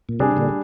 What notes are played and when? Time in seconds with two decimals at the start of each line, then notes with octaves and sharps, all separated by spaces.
0.09 A#2
0.19 C3 G3 D4 G#4
0.37 A#2 D3